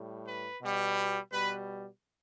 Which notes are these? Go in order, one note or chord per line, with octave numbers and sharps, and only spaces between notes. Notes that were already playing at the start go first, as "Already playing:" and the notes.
Already playing: A2 G3
B4
B2 G3
B2 G3 B4